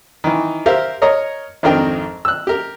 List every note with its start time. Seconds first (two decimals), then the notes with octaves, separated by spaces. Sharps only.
0.24 D#3 E3
0.66 G4 A#4 C5 E5 F5
1.02 A#4 C#5 D#5 A#5
1.63 G#1 F2 D#3 D4 A#4 G5
2.25 E6 F#6
2.47 G4 A#4